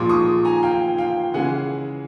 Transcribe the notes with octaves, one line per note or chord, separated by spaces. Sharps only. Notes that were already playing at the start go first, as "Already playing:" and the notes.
Already playing: A#2 F3 G#3 C6 D6
C#6 D#6
G#5 A#5
F5 G5
F5 G5
C#3 E3 G#3 F#5 G#5